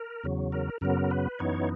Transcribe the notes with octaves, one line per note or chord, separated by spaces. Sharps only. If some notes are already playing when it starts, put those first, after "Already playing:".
Already playing: A#4
E2 C#3 F#3
A#4
F#2 C#3 F#3 B3 A#4
B4
F#2 E3 B3 D#4 C#5